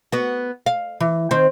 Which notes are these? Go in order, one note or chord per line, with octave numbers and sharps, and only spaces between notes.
B3 F#4
F5
E3
D#3 C4